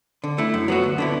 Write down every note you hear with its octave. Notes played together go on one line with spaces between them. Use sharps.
D3
A3 E4
F#2
F#3 B3 F#4
D2
D3 B3 E4